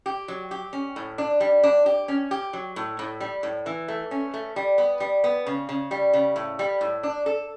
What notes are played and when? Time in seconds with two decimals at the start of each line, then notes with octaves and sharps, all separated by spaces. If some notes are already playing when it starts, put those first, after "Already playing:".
0.06 G4
0.28 F#3
0.51 G4
0.73 C#4
0.96 A2
1.18 D4
1.40 G3
1.63 D4
1.86 G4
2.08 C#4
2.31 G4
2.53 F#3
2.76 A2
2.99 A2
3.20 G3
3.43 A2
3.66 E3
3.88 A3
4.11 C#4
4.34 A3
4.56 G3
4.78 B3
5.00 G3
5.24 B3
5.47 C#3
5.69 C#3
5.91 G3
6.13 C#3
6.36 A2
6.59 G3
6.81 A2
7.03 D4
7.26 A4